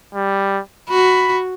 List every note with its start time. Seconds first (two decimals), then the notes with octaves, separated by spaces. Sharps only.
0.14 G3
0.89 F#4 B5